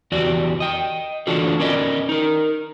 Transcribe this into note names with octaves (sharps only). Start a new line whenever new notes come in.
E2 F#4 G4 D5
D#5 G5
D3 E3 D4 F4 F#4 A4
C#4 A#4 B4 D5 D#5
D#4 A#4